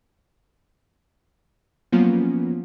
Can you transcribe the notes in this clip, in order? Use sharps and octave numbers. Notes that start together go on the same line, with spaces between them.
F3 F#3 A#3 B3 C#4 F4